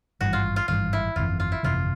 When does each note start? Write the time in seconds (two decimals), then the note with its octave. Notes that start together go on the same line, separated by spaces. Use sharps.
0.21 G#1 G2 E3 F#4
0.33 F4
0.56 F4
0.68 G#1 G2 E3 F4
0.93 E4
1.16 G1 F2 C3 E3 F4
1.40 F4
1.52 E4
1.63 G1 F2 C3 E3 F4